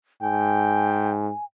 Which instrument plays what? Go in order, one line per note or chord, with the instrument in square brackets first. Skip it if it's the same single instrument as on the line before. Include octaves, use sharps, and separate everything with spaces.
[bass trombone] G#2 [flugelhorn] G5 [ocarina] G#5